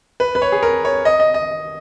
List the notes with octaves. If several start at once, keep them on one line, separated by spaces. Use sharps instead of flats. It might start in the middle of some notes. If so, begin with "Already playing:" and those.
B4
B4
C#5
G#4
A#4
C#5
D#5
D#5
D#5